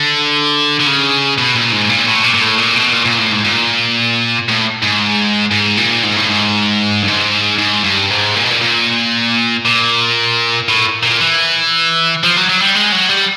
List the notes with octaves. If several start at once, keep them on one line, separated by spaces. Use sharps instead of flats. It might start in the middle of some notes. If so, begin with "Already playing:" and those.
Already playing: D3
D3
C#3
B2
A#2
G#2
A#2
A2
A#2
A#2
A2
A#2
B2
A#2
A#2
A2
G#2
A#2
A2
G#2
G#2
A#2
G#2
A2
G#2
G2
G#2
G#2
G2
G#2
A#2
B2
A#2
A#2
A#2
A2
A#2
E3
F3
F#3
F#3
G3
G#3
F#3
G3